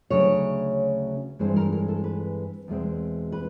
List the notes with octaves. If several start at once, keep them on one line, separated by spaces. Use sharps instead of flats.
D2 C#3 F#3 C#5
G2 E3 G#3 C4 C5
A#4
A#4
A4
B4
E2 B2 G#3 C4
B4